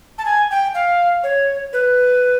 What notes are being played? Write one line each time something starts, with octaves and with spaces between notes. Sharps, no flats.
A5
G#5
G5
F5
C#5
B4